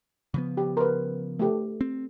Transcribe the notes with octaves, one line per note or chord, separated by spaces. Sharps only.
C#3 F3 B3
G4
A#4 B4
A3 G4
C4